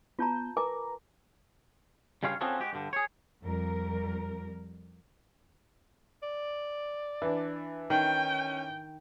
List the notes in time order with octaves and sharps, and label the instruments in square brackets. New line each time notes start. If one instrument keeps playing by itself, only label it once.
[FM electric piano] B3 G6 [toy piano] F4 A5 A#5
[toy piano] A#4 G#5 D6 [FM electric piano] B4 A#5
[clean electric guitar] G2 C#3 G3 F4 C#5 F5
C4 C#4 F4 F#4 G#4 A4
G#3 F#4 G4
G2 D3
G#4 C#5
[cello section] F2 G3 A#4
[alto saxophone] D5
[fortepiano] E3 D4
[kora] D#3 [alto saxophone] C#4 [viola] G5